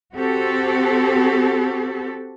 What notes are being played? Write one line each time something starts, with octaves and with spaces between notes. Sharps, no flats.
C4 F#4 G4 A4